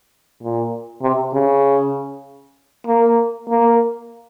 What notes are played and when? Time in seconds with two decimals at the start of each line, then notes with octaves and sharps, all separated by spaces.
0.42 A#2
1.02 C3
1.33 C#3
2.86 A#3
3.48 A#3